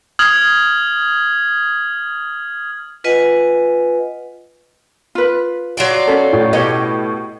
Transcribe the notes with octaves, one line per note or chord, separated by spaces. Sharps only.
D#6 F6 G#6 F#7
F4 B4 D#5 F#5 G#5
F4 B4
F#3 F4 D5
C#4 A4
A2
B2 G4 C#5 D#5